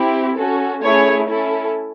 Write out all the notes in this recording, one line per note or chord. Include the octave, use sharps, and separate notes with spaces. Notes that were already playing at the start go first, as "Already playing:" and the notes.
Already playing: C4 E4 G4
C#4 F#4 A4
A3 C#4 E4 G#4 C#5
C#4 E4 A4